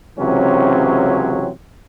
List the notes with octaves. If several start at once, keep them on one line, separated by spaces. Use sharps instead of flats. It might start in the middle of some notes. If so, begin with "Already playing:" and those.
C#2 C3 E3 F#3 C4 C#4